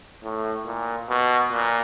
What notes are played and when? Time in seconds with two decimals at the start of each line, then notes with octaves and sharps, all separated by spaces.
0.23 A2
0.66 A#2
1.09 B2
1.52 A#2